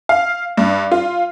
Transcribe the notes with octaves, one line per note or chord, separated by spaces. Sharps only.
F5
G2
F4